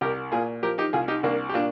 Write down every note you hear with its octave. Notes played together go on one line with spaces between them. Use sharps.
C2 G4 A#4
A#2 F4 G#4
F3 G4 A#4
D#4 G4
C2 F4 G#4
D#4 G4
C2 A#3 D4
G4
A#2 D4 F4